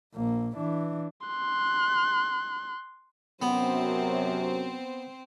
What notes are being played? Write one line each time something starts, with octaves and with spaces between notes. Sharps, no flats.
A#1 A#3
E3 D4
C6 F#6
F#2 C3 F#3 B3 C4 C5